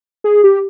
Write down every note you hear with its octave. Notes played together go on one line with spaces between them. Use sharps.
G#4
G4